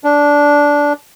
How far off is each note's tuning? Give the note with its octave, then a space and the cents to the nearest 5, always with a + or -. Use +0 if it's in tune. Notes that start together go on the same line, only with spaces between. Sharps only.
D4 -10